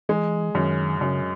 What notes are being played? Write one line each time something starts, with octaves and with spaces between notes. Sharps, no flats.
E3 G#3
F#2 D#3
F#2 C#3